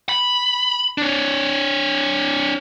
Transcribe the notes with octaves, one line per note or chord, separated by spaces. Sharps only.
B5
D4 C#5